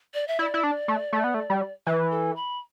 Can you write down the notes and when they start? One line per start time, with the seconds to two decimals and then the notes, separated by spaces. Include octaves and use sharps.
0.14 D5
0.28 E5
0.39 E4 D5
0.54 E4
0.64 D4
0.88 A3
1.13 A3
1.24 B3
1.34 A3
1.50 G3
1.86 E3 B4
2.11 A4
2.36 B5